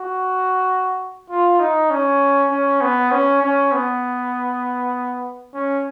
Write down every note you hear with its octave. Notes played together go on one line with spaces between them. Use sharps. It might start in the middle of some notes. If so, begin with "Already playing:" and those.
Already playing: F#4
F4
D#4
C#4
C#4
B3
C#4
C#4
B3
C#4